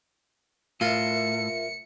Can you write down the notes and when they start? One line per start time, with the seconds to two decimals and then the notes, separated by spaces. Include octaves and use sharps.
0.81 A2 F4 A#4 E5 C#7